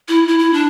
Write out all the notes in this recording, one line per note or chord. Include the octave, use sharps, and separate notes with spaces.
E4
E4
E4
D4